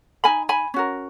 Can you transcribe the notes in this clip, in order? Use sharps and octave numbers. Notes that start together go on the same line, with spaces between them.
D#4 A#4 G#5 B5
G#5 B5
C#4 F#4 A#4